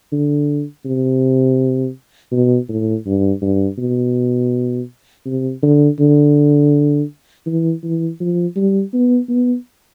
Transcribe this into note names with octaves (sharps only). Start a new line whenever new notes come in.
D3
C3
B2
A2
G2
G2
B2
C3
D3
D3
E3
E3
F3
G3
B3
B3